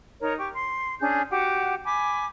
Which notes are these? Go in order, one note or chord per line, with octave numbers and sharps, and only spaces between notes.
D#4 A#4 C#5
G4 C#6
C6
C#4 D4 G#4 G6
F#4 G4 F#5
G#5 B5 D6